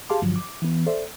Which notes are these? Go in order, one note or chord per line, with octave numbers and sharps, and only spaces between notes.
G4 G#4 F5 A5 C6 D6
G2 D3 F3 F#3
D6
E3 B3
A4 C5 D5 E5